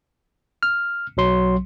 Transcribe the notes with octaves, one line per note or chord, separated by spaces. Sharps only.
F6
B1 F#3 C6